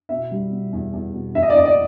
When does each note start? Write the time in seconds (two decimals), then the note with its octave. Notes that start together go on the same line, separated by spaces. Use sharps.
0.09 B2 E5
0.31 G3
0.51 B2
0.73 E2
0.93 E2
1.13 B2
1.35 E2 E5
1.43 D#5
1.50 D5
1.55 E2 D#5
1.65 D5